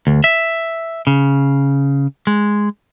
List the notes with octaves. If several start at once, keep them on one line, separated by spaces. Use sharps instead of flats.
D2
E5
C#3
G#3